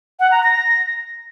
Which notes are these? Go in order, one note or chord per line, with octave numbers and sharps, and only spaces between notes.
F#5
A#5
A#6